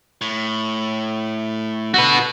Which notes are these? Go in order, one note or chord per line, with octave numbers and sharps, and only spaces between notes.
A2
D3 F#4 B4